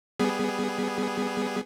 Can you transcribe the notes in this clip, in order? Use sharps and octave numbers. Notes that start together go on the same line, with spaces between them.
G3 B3 G#4